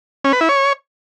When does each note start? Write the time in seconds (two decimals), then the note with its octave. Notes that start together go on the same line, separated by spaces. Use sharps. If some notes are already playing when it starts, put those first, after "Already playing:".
0.24 C#4
0.33 B4
0.41 E4
0.49 C#5